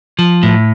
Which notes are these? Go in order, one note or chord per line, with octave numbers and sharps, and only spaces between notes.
F3
A2